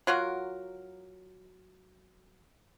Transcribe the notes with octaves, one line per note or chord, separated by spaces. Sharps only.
F#3 F4 F#4 A#4